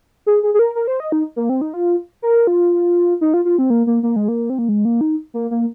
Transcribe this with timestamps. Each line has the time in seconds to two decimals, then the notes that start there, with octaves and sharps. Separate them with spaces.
0.26 G#4
0.43 G#4
0.54 G#4
0.59 A#4
0.75 A#4
0.87 C5
1.00 D#5
1.12 D#4
1.36 A#3
1.49 C4
1.61 D#4
1.74 F4
2.22 A#4
2.47 F4
3.21 D#4
3.34 F4
3.45 F4
3.59 C4
3.70 A#3
3.87 A#3
4.03 A#3
4.16 G#3
4.28 A#3
4.50 C4
4.59 A#3
4.69 G#3
4.85 A#3
5.01 D#4
5.34 A#3
5.51 A#3